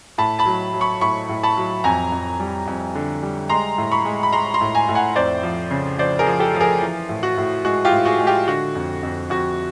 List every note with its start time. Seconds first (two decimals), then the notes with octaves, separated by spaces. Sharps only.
0.18 A2 A5 B5
0.39 A5 B5
0.46 F#3
0.73 F#3
0.81 B5 C#6
1.01 A2 B5 C#6
1.29 A2
1.43 A5 B5
1.57 F#3
1.84 F2 G#5 A#5
2.12 F2
2.39 G3
2.67 F2
2.95 D3
3.22 G3
3.49 G#3 A#5 C6
3.78 A2
3.91 B5 C#6
4.05 G#3
4.23 B5
4.32 G#3 A#5 C6
4.54 A#5 C6
4.61 A2
4.75 G#5 A#5
4.89 A2
4.95 F#5 G#5
5.16 F2 C5 D5
5.43 F3
5.71 C#3
5.98 F3 C5 D5
6.19 G#4 A#4
6.26 F3
6.40 G4 A4
6.54 F3
6.61 G#4 A#4
6.82 E3
7.09 A2
7.23 F#4
7.38 A2
7.65 G#3 F#4
7.85 F4 G4
7.92 A2
8.05 F#4 G#4
8.19 G#3
8.27 F4 G4
8.48 D3 F#4
8.75 F2
9.03 F2
9.30 F2 F#4